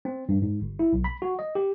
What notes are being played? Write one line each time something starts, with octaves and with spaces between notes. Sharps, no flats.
C4
G2
G#2
G1
E4
B1
B5
F#4
D#5
G4